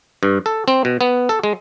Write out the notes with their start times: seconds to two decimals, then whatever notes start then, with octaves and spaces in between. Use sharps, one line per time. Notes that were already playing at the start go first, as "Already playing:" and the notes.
0.23 G2
0.46 A4
0.68 C4
0.85 B2
1.01 B3
1.29 A4
1.44 G#3